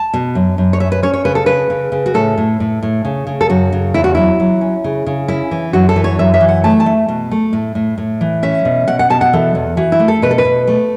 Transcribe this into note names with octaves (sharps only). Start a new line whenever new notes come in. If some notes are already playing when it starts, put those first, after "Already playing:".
Already playing: A5
B2
F#2
F#2
C#5
C#4 E5
B4
C#4 C#5
C#5
C#3 B4
A4
C#3 B4
C#3
C#3
F#4
A2 A4
A2
A2
A2
C#3
C#3
A4
F#2 F#4
C#3
E2 E4
F#4
F#3 E4
F#3
C#4
C#3
C#3
C#4 E4
E3
F#2 F#4
A4
E3
C#5
F#2 E5
E5
E3
F#5
A3 A5
A5
A3
B2
A3
A2
A2
A2
E3
C#4 E5
B2
B2 F#5
F#5
B2 A5
F#5
E3 A4
E2
E3 F#4
E4
A3
A4
B2 B4
A4
B4
B2
A3